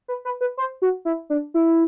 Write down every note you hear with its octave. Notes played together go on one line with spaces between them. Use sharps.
B4
B4
B4
C5
F#4
E4
D4
E4